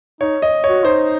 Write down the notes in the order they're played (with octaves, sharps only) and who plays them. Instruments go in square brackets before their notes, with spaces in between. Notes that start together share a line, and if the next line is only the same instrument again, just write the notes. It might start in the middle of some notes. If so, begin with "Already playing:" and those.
[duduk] D#4 [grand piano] C#5
[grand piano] D#5
[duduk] F#4 [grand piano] C#5
[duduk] D#4 [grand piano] C5